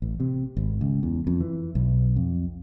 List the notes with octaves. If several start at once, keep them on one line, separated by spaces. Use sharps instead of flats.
A1
C3
G#1
C#2
E2
F2
E3
B1
F2